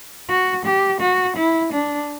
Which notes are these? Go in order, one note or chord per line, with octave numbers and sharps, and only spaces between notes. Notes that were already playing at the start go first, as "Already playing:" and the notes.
F#4
G4
F#4
E4
D4